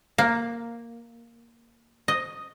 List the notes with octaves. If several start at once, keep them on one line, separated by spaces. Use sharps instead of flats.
A#3
D#5